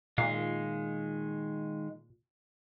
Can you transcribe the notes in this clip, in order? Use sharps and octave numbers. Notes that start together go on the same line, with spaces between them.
A#2 D#3 G#3 F5